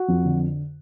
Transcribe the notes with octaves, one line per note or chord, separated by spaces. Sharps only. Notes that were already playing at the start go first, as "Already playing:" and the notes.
Already playing: F#4
F2
D3